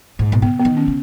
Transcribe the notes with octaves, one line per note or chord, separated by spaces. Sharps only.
G#2
B2
C#3 B3
B3
D#3
C#4
C#3